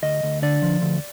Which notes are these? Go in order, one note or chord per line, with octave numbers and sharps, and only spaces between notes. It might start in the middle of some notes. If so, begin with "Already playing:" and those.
D2 D#5
D2
D3 D5
F3
D2